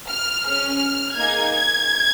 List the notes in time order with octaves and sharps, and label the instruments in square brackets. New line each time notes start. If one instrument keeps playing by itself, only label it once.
[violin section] F6
C#4 G#4 F6
A#3 D#4 G#4 G#6
G#6